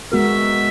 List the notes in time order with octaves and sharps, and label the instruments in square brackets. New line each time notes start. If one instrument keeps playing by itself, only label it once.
[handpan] G#3 B3 F#4 A#4 [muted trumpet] E5